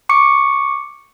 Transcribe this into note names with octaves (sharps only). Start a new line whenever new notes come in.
C#6 D6 C#7